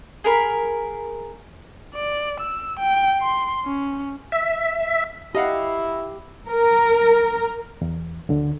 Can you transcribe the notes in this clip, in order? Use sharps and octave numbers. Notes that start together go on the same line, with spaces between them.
G#4 A#4 B5
D5
E6
G5
C6
C#4
E5
E4 G4 D#5 F5 F#5
A#4
E2
D2 D3